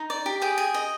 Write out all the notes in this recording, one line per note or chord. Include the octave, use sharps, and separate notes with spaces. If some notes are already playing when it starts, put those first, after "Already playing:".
Already playing: D#4
D5
G4
G#4 G5
G#4
D#5